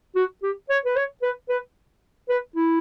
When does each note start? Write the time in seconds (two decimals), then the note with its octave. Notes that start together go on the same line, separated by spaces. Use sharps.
0.15 F#4
0.42 G4
0.69 C#5
0.85 B4
0.96 C#5
1.22 B4
1.49 B4
2.29 B4
2.56 E4